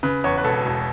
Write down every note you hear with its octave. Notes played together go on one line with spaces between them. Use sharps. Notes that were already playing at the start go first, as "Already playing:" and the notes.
C#3 B4
E2 C#5
B4
E1 A4
E1